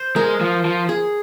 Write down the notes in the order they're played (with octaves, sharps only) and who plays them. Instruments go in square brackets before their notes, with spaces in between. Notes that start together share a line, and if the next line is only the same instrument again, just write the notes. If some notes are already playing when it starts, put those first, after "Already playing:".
Already playing: [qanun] C5
[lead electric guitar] G#3 [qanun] A#4
[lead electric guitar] F3
F3
[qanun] G#4